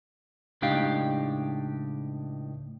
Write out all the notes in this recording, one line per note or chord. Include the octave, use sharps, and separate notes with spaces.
C#2 A2 D4 D#4 G4 F5